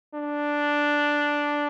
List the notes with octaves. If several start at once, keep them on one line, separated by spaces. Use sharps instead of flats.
D4